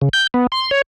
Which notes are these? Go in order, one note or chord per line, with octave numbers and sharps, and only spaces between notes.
C#3
G6
B3
C6
C#5